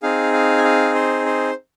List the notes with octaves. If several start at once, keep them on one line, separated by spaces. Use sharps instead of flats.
C4 D#4 G#4 F5
F5
G#5
F5
C5
C5